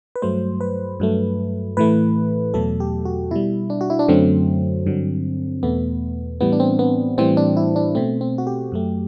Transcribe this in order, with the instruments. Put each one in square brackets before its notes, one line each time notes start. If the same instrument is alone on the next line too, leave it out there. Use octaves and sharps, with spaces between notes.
[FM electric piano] B4
G2 F#3 A3 C5
B4
G2 F#3 A3
A2 E3 A3 B4
E2 B2 F#3 A3 A4
G4
F#4
B2 G3 E4
D4
F#4
E4
D4
F#2 D3 F#3 A3 C4
G2 D3 F#3
E2 B2 A3 B3
A2 E3 G3 B3
D4
C4
B3
A2 E3 G3 C4
D4
E4
D4
B2 A3 C4
C4
F#4
G4
F#2 F#3 A3